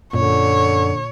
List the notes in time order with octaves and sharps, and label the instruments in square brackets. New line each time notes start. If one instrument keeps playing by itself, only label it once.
[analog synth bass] F#2 [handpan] A#2 [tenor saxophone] D3 [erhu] C#5